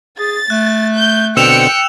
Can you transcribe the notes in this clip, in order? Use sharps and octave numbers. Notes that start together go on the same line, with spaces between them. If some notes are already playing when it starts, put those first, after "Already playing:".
G#4 A6
A3 F#6
G6
B2 D3 C4 G5 E6 C#7 E7 F7